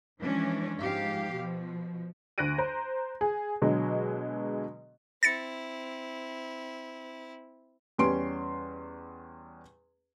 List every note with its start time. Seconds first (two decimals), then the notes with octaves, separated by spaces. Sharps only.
0.19 E3 F3 G#3 C#4 D4
0.79 G#2 F3 G4 F5
1.34 B2 F3
2.38 D2 F#6 A#6 D7 D#7
2.58 C5 A#5
3.21 G#4
3.62 B2 D3 F#3 G#3
5.23 C4 E4 A6 A#6 C#7
7.98 E2 G3 C#4 C6 D7